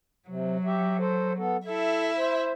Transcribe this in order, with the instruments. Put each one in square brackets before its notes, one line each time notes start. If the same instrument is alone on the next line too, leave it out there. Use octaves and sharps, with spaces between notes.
[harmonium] C3 [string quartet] F#3
[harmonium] G4 E5
A4 C5
B3 A4
[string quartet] E4 E5 [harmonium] A4
[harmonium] C5